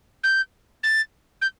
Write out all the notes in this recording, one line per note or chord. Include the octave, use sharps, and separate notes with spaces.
G6
A6
G6